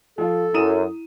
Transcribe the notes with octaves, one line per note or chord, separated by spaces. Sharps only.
F3 F4 A4
F#2 E4 D#6 D#7 E7